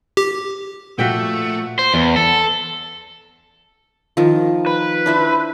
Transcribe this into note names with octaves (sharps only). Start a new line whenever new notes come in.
G4
A#2 F3 A3 F#4 E5 F#5 G5 B6
C5
E2
A4
D#3 F3
B4
D4 E4 C5